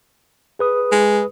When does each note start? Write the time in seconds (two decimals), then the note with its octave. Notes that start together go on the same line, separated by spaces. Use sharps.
0.59 G#4 B4 D#6
0.92 G#3